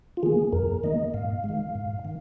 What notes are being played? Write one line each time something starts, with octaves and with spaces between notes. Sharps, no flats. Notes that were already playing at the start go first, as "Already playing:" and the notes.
F4
D#3 A#3 G#4
F2 A#4
D#3 A#3 D#5
G#2 F5
D#3 G#3
G#2
D#3